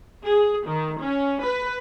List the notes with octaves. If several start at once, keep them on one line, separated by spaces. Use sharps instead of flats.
G#4
D#3
C#4
B4